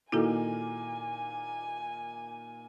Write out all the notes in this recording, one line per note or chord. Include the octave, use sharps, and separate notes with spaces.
A#2 D#3 A#3 E4 F#4 A4 G#5